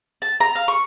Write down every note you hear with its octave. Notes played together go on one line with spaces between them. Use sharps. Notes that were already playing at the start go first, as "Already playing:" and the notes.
A5
A#5
F5
C#6